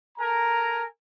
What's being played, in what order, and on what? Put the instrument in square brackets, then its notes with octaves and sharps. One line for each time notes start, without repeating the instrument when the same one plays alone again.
[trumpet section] A4 A#4 G#5 A#5